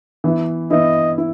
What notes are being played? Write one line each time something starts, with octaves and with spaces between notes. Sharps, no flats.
E3 B3 E4
E3 B3 E4 D#5
E4